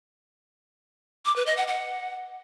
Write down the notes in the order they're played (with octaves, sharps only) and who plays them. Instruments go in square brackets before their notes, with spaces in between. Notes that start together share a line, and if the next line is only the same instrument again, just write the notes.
[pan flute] D6
B4
D#5
F#5
F#5